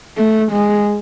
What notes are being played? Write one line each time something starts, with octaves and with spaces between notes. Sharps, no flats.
A3
G#3